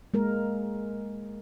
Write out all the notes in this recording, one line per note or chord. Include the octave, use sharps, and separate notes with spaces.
G#3 A#3 A#4